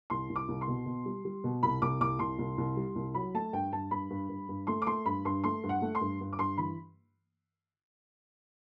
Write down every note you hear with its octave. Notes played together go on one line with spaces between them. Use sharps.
C2 C6
C2
D6
C2
C6
B2
B2
G3
G3
B2
C2 B5
C2 D6
C2 D6
C2 C6
C2
C2
G3
C2
F#3 B5
A3 A5
G2 G5
G2 A5
G2 B5
G2
G2
G2
A3 C6
D6
A3 C6
G2 B5
G2 C6
A3 C6
G2
F#5
A3
C6
G2
G2
D6
G2 C6
E3 B5